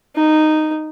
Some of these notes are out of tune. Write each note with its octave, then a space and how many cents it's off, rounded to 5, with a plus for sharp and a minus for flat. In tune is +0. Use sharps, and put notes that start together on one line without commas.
D#4 -10